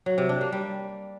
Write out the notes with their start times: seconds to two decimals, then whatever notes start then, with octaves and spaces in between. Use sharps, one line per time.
0.06 F#3
0.18 C3
0.29 D4
0.41 A#3
0.52 G3